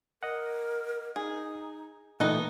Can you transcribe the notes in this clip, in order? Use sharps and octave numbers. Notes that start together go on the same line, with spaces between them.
A#4 D#5 F#5
D#4 G#4
A#2 E3 A3 B3 D#4 D#5 G5